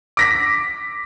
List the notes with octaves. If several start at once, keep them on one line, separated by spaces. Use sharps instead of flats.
D6 A#6 B6